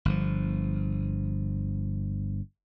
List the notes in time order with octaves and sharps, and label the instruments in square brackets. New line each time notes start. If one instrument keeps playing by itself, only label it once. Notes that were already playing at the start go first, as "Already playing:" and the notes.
[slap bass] G1 F3